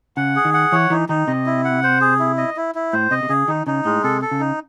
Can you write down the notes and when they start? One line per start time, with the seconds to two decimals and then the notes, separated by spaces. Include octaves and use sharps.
0.17 C#3 F#5
0.36 G#4
0.45 D#3
0.54 F#5
0.72 E3 C#5
0.90 E3 D#4
1.09 D#3 D#4
1.27 C3 D#5
1.46 E4
1.64 F#5
1.83 C5
2.01 G#4
2.19 E4
2.38 D#5
2.56 E4
2.75 E4
2.93 A2 C5
3.11 C3 D#5
3.23 C3
3.29 C#3 G#4
3.48 D#3 D#4
3.67 C#3 D#4
3.85 A2 G#3
4.04 C3 A4
4.22 A4
4.31 C#3
4.40 D#4